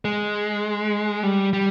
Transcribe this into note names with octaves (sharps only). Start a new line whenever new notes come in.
G#3
G3
G3